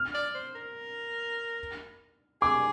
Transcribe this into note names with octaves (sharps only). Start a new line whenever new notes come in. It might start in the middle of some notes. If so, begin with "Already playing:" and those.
Already playing: F6
D5
C5
A#4
G#4 D6